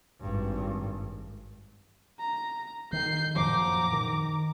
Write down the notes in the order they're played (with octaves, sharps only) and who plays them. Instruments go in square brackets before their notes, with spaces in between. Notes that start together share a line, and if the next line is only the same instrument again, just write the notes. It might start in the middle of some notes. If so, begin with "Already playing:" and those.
[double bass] G#1 G2
[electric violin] A#5
[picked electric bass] D#3 [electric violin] G6 C7
[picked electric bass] F#2 A#2 F3 [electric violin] A#5 D6
[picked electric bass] D#3